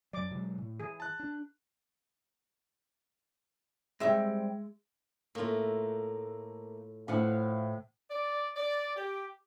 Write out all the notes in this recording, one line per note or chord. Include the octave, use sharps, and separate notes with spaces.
F#2 F#3 D5 D6
B2 F#3 G#3
A2
E3 G#4
A5 F#6
D4
G3 G#3 C4 E5
A2 A3 A#3 F4
A2 E3 F3 F5 F#5
D5
D5
G4